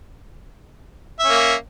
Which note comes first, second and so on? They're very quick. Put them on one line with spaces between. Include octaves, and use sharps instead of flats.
E5 C#4 A#3